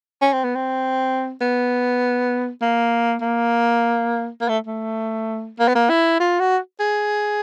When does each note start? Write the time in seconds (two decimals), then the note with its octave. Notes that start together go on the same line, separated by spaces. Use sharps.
0.22 C#4
0.33 C4
0.44 B3
0.55 C4
1.41 B3
2.62 A#3
3.21 A#3
4.41 A#3
4.49 A3
4.67 A3
5.59 A#3
5.68 B3
5.75 A#3
5.90 E4
6.20 F4
6.39 F#4
6.80 G#4